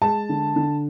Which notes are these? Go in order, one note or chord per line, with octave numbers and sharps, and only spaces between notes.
G#3 A5
D3
D3